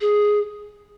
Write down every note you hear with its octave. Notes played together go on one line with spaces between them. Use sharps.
G#4